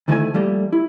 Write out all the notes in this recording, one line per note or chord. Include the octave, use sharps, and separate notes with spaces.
D2 D#3 A3 E4 A#4 G#5
F3 G3 A3 A#3
E4